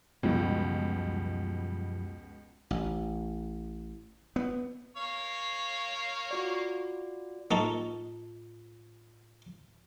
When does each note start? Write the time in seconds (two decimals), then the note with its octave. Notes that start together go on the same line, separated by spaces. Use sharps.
0.23 C#2 F#2 B2 F3 G3
2.71 A1
4.36 B3
4.97 A#3 C#5 F5
6.31 F4 F#4 D5
7.51 A2 A#3 D#4 F4 A4 A5